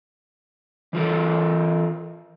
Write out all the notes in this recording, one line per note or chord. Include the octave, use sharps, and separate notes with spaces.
E3 F4 A4 A#4